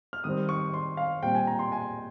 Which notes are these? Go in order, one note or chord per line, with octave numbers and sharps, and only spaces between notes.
F6
D#3 G3 C4 D#6
C#6
C6
F5
A#2 G3 C4 G5
G#5
A#5
C6
G#5